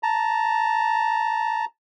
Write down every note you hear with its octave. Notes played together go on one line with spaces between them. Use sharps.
A5 A#5